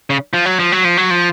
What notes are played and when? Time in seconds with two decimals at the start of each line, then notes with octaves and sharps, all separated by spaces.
0.10 C#3
0.33 F3
0.45 F#3
0.59 F3
0.72 F#3
0.84 F3
0.97 F#3
1.11 F3